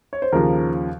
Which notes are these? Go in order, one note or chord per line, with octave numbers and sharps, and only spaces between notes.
C#5
C5
D#2 C#3 F3 A#4